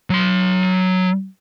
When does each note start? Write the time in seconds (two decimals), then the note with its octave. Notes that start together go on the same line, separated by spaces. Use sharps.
0.10 F#3 C6